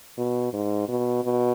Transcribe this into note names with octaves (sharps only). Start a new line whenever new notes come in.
B2
G#2
B2
B2